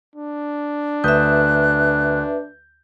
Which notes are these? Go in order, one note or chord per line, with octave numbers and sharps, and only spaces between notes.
D4
D2 B4 E5 D#6 F#6 G6